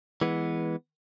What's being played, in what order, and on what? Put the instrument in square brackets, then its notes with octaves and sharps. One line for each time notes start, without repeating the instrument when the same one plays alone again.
[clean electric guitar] E3 G#3 B3